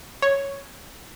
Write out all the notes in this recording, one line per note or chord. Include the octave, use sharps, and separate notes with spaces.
C#5